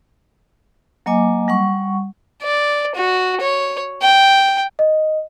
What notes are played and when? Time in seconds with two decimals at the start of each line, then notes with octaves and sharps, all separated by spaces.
1.06 F#3 A#3 D#5 G#5 D6
1.48 G3 F#5 C#6
2.43 D5
2.95 F#4
3.41 C#5
4.02 G5
4.79 D#5